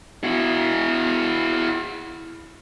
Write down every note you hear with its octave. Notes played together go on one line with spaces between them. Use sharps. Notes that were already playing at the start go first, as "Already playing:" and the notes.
E4 F#4